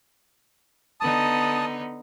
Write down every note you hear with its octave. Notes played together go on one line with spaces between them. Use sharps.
D3 B3 D#4 A5 D#6